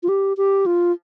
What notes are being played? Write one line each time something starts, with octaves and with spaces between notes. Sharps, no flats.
F4
G4
G4
F4